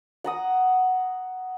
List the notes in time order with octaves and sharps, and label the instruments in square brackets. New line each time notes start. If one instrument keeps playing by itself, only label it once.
[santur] F#5 A#5 D#6